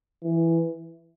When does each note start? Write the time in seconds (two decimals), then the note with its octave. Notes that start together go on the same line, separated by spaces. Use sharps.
0.23 E3